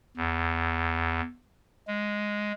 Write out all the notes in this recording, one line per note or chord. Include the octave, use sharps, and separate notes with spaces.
E2
G#3